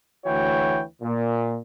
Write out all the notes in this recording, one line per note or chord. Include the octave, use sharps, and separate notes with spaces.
D2 E3 F#4 C#5 G5
A#2